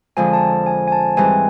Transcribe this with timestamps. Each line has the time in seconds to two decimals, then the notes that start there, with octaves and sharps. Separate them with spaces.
0.17 F2 D3 F3 G#3 G#5
0.33 A5
0.66 G#5
0.88 G#5
0.92 A5
1.17 G#2 E3 G3 C4 G#5